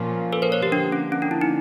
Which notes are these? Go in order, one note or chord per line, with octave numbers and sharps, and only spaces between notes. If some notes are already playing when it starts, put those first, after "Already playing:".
Already playing: A#2 F3 A#3 C#4 F4
A4 B4
A#4 C5
B4 C#5
G4
D3 F3 A#3 D4
C#4
C#4
D4
E4
D#4